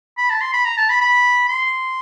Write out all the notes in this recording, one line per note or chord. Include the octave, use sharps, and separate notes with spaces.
B5
A5
C6
B5
A#5
A5
B5
B5
C6